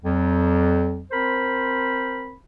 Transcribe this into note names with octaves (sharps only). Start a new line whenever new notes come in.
F2 F#3
C4 A#4 C5 B5